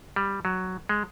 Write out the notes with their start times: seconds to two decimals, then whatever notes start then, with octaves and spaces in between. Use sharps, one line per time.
0.16 G3
0.45 F#3
0.89 G#3